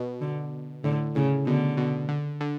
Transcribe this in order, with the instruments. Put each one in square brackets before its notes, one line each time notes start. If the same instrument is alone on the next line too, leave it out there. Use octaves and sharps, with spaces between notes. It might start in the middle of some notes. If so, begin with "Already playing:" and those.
Already playing: [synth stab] B2
[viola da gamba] D3
[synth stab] A2 [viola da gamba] D3
[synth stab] A2 [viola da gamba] C#3
[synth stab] B2 [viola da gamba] D3
[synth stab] B2
D3
D3